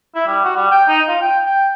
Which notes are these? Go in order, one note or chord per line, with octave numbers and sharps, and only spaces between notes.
E4
G3
F#4
G3
G5
D#4
F4
G5
G5